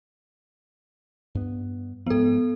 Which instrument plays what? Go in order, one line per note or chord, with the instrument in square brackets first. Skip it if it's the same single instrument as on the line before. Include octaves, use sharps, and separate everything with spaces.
[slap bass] G2 B3
[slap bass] G#2 F3 [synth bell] B3 A4